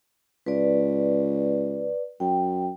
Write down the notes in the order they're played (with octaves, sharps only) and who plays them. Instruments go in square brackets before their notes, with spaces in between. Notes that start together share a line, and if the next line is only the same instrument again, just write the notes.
[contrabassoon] C#2 [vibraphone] B4 D5
[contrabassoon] F#2 [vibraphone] G5